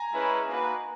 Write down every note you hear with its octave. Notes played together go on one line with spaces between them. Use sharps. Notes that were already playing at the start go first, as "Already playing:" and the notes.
Already playing: G#5 A#5
G#3 C#4 E4 G#4 B4
A#3 D#4 F#4 B4